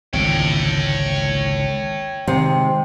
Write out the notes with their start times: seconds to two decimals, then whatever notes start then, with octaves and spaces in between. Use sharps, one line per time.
0.13 G#1 C#2 D3 C#5 G5
2.27 C3 D#3 G#3